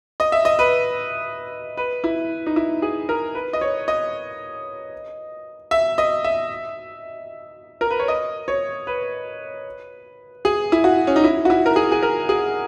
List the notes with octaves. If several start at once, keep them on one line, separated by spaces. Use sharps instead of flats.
D#5
E5
D#5
B4
B4
E4
D#4
E4
G#4
A#4
B4
D#5
C#5
D#5
E5
D#5
E5
A#4
B4
C#5
D#5
C#5
B4
G#4
E4
F#4
C#4
D#4
E4
F#4
E4
A#4
G#4
G#4
A#4
G#4